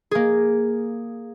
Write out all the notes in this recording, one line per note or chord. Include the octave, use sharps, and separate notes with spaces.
A#3 G#4